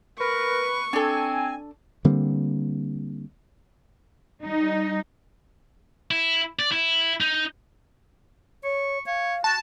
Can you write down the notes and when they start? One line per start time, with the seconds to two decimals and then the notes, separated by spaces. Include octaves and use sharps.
0.20 A#4 B4 C#6
0.93 C4 D4 A4 G#5
2.05 D3 G3 A#3 C4
4.42 G3 D#4
6.11 E4
6.59 D5
6.72 E4
7.20 D#4
8.64 C#5 C#6
9.06 C#5 F5
9.44 F#4 A5